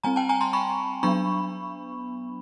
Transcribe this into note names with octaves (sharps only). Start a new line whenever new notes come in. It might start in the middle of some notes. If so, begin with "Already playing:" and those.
G3 C4 G#5 A#5
G5 A5
G#5 A#5
A#5 C6
B5 C#6
F#3 B3 D4 B5 C#6